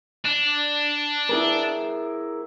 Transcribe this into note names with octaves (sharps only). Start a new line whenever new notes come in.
D4
E4 G#4 A#4